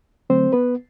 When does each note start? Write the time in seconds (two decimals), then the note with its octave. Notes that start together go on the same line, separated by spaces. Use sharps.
0.30 D3 F#3 A3 C4 C5
0.53 B3 B4